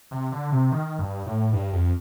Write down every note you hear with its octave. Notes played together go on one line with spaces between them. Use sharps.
C3
D3
C3
D#3
G2
A2
G2
F2